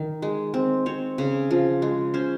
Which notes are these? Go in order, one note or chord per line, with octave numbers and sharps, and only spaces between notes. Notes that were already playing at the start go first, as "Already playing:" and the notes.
Already playing: D#3
G#3
C4
C4 C#5
C#3
F3
G#3
C#4 C5